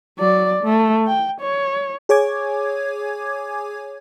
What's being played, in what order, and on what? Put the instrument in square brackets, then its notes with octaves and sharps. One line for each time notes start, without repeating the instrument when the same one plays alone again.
[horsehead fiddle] F#3 D5
A3
G5
C#5
[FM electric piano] G#4 C#5 G#5 D6 G#6